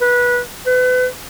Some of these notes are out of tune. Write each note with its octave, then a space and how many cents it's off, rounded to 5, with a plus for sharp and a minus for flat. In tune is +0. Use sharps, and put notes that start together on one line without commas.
B4 -20
B4 +35